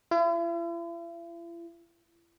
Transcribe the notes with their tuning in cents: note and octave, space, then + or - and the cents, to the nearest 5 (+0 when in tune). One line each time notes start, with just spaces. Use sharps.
E4 +45